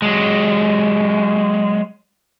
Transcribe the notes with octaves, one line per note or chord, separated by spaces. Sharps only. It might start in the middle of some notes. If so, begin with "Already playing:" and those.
F#3 G#3